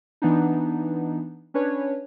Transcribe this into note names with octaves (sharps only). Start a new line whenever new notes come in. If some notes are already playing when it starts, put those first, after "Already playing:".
E3 B3 D4 D#4
C#4 D4 B4 C#5